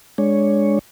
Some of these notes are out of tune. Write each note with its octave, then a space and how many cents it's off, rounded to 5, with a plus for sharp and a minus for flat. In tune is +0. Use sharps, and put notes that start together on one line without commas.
G#3 +0 D4 +0 C#5 +0